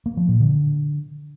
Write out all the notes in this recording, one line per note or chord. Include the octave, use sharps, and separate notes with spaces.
A#3
F3
A#2
D3